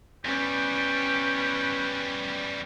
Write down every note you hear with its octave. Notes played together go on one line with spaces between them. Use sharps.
E2 G3 C#4 G4 B4